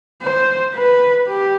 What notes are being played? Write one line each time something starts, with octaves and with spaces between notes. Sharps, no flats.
C5
B4
G4